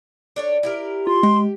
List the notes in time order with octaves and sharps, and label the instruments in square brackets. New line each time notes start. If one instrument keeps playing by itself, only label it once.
[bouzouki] D4 A4 C#5
E4 G4 A#4
[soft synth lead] F4 [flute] C6
[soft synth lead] G#3 [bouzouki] G4